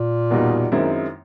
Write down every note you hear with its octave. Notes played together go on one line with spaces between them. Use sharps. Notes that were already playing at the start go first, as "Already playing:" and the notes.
Already playing: A#2
E2 B2 G3 A#3 D#4
F#2 D#3 G#3 C4 E4